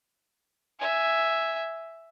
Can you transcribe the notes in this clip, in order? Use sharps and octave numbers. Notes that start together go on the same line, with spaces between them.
E5 G#5